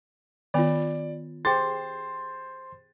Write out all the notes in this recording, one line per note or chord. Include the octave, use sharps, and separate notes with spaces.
D#3 B3 F4 C#5 D5
G4 G#4 C5 G5 C6 A6